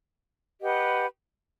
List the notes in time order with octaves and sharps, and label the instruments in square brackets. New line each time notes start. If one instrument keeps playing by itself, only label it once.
[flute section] G4 B4 D#5 F#5